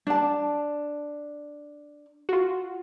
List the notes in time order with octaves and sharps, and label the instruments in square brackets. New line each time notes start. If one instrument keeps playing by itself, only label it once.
[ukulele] D4 A5
[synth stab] F4 F#4